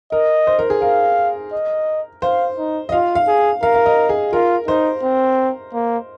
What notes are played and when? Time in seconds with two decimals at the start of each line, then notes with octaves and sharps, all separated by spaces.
0.12 A#4 D#5
0.47 C5
0.59 A#4
0.70 G#4
0.82 A#4 F5
1.52 D#5
2.22 C5 F5
2.58 D#4
2.89 D#5
2.92 F4 F5
3.15 F5
3.27 G#4
3.63 A#4 F5
3.74 F5
3.86 D#5
4.09 G#4
4.32 F4 A#4
4.68 D#4 C5
5.03 C4
5.73 A#3